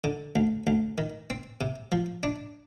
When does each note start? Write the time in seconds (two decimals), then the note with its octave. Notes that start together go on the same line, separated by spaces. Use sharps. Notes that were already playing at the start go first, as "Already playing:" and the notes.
0.04 D3
0.36 D2
0.67 D2
0.98 D#3
1.30 C4
1.61 C3
1.92 F3
2.23 D4